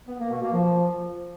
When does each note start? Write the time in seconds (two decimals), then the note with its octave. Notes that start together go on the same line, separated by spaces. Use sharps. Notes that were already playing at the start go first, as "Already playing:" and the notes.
0.07 B3
0.19 A#3
0.30 B2
0.42 A#3
0.53 F3